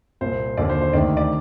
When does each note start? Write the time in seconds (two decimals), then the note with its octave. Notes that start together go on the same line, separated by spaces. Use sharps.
0.21 C2 A#2 C5
0.57 D#2 D3 D5
0.69 C5
0.81 C5
0.93 D2 C3 D#3 D5
1.17 D5